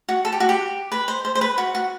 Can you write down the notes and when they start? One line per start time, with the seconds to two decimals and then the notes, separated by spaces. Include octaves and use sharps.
0.09 F#4
0.25 A4
0.32 G4
0.40 F#4
0.49 G4
0.92 B4
1.08 C5
1.25 C5
1.35 C5
1.41 B4
1.58 F#4
1.75 F#4